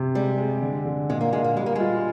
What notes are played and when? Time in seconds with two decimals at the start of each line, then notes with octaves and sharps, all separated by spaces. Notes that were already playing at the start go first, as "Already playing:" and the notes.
Already playing: C3
0.14 G3 G#3
0.38 G#3
0.62 D3
0.85 D3
1.09 A#2 G#3
1.21 A#3
1.33 A#2 G#3
1.44 A#3
1.57 G3 G#3
1.66 A#3
1.75 G#3 F4